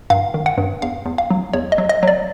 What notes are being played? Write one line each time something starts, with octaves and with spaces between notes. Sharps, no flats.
G2 F5
D#3
F#5
G2
E2 F5
E2
F5
F#3
E2 C#5
D#5
F#3
D#5
F#3 D5